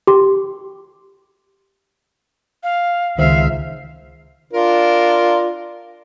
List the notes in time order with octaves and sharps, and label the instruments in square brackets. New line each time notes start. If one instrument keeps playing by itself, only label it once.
[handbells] G4 C6
[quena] F5
[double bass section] C#2 [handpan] D#3 C5 [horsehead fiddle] E5 F5
[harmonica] D4 F4 A#4